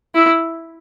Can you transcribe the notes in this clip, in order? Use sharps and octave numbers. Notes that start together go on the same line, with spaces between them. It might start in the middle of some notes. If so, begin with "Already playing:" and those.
E4